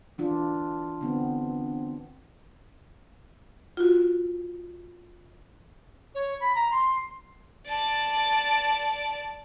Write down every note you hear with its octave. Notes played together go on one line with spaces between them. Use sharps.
E3 D4 F4
D3 B3 C4
F4 F#4
C#5
B5
A#5
C6
D5 A5